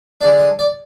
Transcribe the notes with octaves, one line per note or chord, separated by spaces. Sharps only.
D3 G#3 D4 D5
D#5
D5